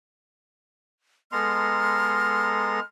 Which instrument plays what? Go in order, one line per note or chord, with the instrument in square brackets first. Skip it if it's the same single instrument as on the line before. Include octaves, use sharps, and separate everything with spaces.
[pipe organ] G#3 A4 A#5 [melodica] B3 C6 [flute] F6